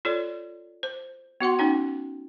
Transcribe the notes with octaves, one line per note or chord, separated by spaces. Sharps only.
F4 A4 C#5 D5
C5
B3 F#4 F#5 C6
C#4 D#4 G5